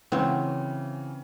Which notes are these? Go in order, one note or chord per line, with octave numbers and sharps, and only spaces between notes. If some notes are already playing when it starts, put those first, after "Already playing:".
C#3 E3 C4 F#4 C#5